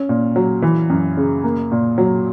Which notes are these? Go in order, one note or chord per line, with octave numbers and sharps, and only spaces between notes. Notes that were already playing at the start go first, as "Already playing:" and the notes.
Already playing: C#4
A#2
F#3
E3
F#2
C#3
A#3
A#2
F#3